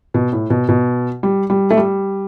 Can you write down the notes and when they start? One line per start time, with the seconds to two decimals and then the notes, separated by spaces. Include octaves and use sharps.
0.14 B2
0.32 A2
0.50 B2
0.69 B2
1.23 G3
1.50 G3
1.70 A3
1.77 G3